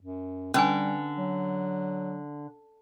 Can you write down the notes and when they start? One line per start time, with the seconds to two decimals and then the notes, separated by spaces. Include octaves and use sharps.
0.02 F#2
0.54 D3 G3 C#4 B4 G#5
1.16 F#3